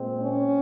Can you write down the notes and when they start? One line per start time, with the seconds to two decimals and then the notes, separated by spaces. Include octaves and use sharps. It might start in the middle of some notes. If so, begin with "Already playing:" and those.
Already playing: A#2 G#3 C4
0.23 C#4